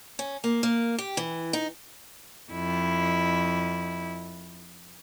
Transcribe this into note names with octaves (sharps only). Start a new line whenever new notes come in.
C#4
A#3
A#3
G4
E3
D#4
F2 E4